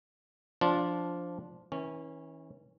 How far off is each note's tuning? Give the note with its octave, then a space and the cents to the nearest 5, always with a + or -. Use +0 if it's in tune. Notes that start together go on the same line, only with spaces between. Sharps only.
F3 +0 D4 -10 F4 +0
E3 -35 C#4 -15